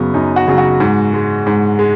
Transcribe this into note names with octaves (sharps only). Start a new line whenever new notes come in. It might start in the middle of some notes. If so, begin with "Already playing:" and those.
Already playing: F#2 C#3 F#3 B3
F#2 D#4
F#4
C#3 F#3
F#4
G#2
G#3
G#2
G#3